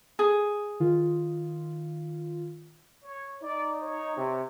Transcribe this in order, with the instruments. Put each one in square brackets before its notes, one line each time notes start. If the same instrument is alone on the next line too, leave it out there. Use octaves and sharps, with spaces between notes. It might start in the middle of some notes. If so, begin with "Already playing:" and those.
[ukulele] G#4
[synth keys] D#3 F4
[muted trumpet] C#5
[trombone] D#4 [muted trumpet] D5
[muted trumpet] C#5
[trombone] C3